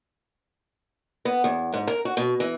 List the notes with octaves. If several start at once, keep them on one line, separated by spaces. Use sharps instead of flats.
B3
E2
G#2
A#4
F#4
B2
E3